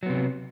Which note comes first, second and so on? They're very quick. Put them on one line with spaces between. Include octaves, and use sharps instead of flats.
F#3 B3 C3